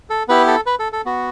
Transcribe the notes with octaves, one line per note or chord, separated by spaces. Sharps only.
A4
B3 E4 G4 B4
A4
B4
A4
A4
B3 F#4